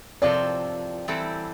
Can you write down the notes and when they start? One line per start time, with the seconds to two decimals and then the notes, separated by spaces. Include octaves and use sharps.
0.22 C3 F3 C4 F4 A4 D5
1.08 E3 G3 C4 E4 A4